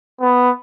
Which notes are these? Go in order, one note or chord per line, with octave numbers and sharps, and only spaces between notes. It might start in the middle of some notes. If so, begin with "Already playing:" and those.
B3